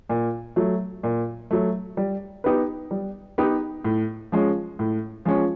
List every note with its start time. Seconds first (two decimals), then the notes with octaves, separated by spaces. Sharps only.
0.10 A#2
0.56 F#3 A3
1.03 A#2
1.51 F#3 A3
1.97 G3
2.44 B3 D#4 G4 B4
2.91 G3
3.38 B3 D#4 G4 B4
3.85 A2
4.32 F3 G#3 C#4
4.79 A2
5.25 F3 G#3 C#4